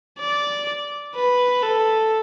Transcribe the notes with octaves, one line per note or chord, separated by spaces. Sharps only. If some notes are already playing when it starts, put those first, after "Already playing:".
D5
B4
A4